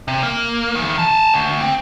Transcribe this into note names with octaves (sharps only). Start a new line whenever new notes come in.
C3
A#3
D#3 E3
G#5 A5
D2
C4